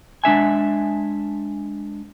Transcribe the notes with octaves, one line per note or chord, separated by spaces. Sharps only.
G#3 D4 E5 G#5